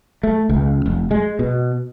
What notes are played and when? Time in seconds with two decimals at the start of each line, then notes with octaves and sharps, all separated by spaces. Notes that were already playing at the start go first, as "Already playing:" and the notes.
0.23 A3
0.49 C#2
0.86 F1
1.11 G#3
1.39 B2